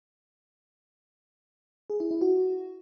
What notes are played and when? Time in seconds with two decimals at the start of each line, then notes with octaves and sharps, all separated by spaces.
1.90 G#4
2.00 E4
2.11 E4
2.21 F#4